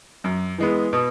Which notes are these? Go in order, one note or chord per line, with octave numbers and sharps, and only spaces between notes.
F#2
E3 G#3 B3
B2